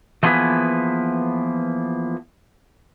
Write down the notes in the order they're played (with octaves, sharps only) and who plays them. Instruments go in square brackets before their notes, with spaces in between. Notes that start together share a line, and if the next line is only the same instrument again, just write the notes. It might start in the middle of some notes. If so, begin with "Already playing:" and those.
[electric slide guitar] E3 F3 A#3 B3 G#4 B4